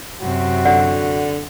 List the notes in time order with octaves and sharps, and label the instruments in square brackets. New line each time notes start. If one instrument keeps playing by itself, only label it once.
[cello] F#2 C3 [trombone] F#4
[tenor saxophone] D3 [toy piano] D5 F#5